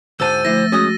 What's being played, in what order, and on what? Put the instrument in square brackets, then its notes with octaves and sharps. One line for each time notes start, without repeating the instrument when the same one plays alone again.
[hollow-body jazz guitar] D2 G#2 A5 [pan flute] C5 [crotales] E6 A6 D#7
[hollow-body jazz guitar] D2 E4 [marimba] F3 A3 [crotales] A#6
[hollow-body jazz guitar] G#3 C#4 [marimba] F#4 [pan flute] D#6